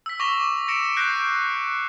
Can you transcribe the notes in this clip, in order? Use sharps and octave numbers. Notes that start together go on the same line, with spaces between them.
E6 B6
C#6 D6 A#6 F7 G7
A#6 C#7 D7 E7
F#6 G6 A#6 C7 D7